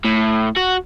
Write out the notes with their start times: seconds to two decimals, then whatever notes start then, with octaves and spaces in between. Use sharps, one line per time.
0.04 A2
0.57 F#4